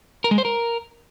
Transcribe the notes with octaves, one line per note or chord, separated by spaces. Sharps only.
A#4
G#3
C5
A#4